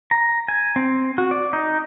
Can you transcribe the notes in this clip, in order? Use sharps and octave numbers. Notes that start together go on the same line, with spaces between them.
A#5
G#5
C4
F#4
D5
D#4